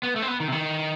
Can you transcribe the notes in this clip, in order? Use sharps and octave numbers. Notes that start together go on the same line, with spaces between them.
B3
A3
C4
B3
D#3
C3
D#3